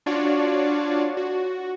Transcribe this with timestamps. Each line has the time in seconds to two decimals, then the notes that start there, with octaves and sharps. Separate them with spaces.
0.06 D4 F4 F#4 C#5 D5
1.17 F#4